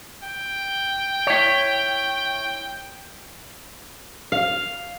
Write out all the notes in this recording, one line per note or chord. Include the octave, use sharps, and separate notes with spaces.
G5
E4 C#5
F5